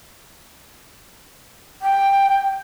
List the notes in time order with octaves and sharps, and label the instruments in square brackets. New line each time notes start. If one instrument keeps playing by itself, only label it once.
[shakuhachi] G5